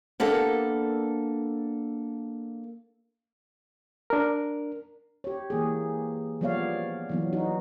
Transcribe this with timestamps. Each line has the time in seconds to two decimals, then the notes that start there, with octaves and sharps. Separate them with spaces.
0.20 A#3 B3 D4 G4 A4 A#4
4.10 D4 A#4
5.24 G4 C#5
5.50 E3 A#3 G#4
6.41 F3 G3 B3 C#5 D5 F5
7.09 E3 F#3 B3
7.33 D#4 F#4